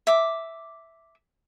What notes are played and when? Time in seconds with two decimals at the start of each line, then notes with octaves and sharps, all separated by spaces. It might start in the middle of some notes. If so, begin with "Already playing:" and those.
0.07 E5 D6